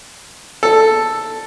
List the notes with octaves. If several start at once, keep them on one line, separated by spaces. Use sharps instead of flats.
A4